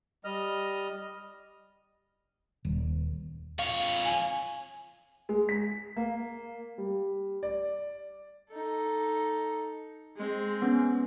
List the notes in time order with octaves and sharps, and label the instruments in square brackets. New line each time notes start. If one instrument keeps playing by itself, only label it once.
[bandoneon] G3 D#5 F6
[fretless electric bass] D#1
[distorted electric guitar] F2 C#5 [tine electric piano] F5
[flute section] G#5
[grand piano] G#3
B6
A#3
G3
D5
[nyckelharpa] D#4 A4
G#3 C4
[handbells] B3 C#4